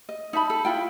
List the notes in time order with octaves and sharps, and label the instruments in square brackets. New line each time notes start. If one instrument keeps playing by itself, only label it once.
[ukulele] D#5
D#4 E5 A5 B5
A4
E4 F4 G5